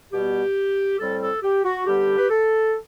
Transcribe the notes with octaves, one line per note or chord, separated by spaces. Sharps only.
B2 G3 B3 G4
A2 G3 C4 A4
A4
G4
F#4
D3 G3 B3 G4
B4
A4